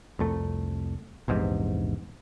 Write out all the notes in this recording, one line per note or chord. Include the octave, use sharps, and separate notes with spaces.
C2 F2 A3
A#1 E2 G#2 C3